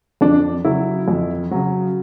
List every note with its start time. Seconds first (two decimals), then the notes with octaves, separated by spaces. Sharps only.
0.21 F2 D4
0.65 C#3 F#3 E4
1.08 F2
1.51 C#3 F#3